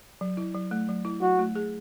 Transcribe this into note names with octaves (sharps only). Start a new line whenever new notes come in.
F#3
E4
F#3
A3
F#3
E4
F#3 F#4
A3
G#4